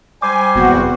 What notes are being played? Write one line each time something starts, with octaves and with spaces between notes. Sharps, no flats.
G3 C5 G#5 D6
F1 E2 B3 F#4